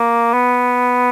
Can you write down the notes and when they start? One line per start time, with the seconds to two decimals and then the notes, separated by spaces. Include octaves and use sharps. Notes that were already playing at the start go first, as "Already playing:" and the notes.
Already playing: A#3
0.33 B3